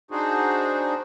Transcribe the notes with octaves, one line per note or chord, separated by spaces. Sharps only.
D4 D#4 F#4 G#4 C5